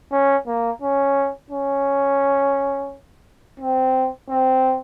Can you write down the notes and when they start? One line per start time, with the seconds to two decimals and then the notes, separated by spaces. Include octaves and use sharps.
0.12 C#4
0.47 A#3
0.82 C#4
1.51 C#4
3.60 C4
4.29 C4